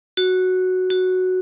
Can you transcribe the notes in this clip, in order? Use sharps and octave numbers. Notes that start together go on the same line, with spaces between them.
F#4
F#4